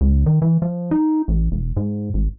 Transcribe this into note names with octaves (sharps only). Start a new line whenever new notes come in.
C#2
D#3
E3
F3
D#4
A1
E1
G#2
G#1